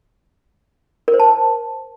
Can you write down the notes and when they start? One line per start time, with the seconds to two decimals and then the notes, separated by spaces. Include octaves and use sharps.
1.08 A#4
1.14 C5
1.20 A5